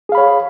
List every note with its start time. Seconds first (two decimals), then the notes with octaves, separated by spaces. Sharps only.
0.09 G#4
0.12 F5
0.15 B5
0.18 C#5